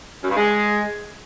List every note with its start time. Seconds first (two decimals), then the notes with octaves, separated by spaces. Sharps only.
0.23 F#2
0.30 G2
0.37 G#3